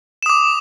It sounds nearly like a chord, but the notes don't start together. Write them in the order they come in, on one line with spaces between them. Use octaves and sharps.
E7 D#6 D6